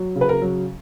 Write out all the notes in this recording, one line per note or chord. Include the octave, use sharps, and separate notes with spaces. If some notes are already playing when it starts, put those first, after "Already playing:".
Already playing: F#3
C#3
B4
A#4
F#3